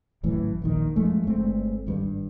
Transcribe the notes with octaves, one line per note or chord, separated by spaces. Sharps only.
G#1 F#2 A2 E3
D#1 A#1 D#3
F#2 F3 G#3 A3
G1 G#3 A3 C4
G#1 G2 G3